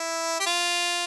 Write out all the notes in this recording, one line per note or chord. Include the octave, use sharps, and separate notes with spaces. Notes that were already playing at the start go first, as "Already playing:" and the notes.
Already playing: E4
G4
F4